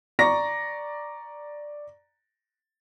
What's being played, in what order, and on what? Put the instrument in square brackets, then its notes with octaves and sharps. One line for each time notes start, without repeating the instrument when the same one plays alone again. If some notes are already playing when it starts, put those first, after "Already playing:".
[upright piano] D5 A#5 C#6 A#6